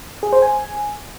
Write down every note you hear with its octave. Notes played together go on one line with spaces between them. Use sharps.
G#4
C5
G#5